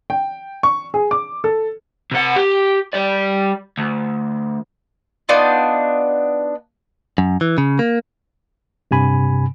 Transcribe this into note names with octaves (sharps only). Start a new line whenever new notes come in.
G5
C#6
G#4
D6
A4
C3 F#5
G4
G3 D5
D2
B3 D4 D#4 F4
F#2
E3
C#3
A#3
G2 C3 G#5 B5